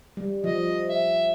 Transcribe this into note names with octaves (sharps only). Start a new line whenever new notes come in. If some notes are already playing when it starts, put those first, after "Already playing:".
G3
F3 D#5
E5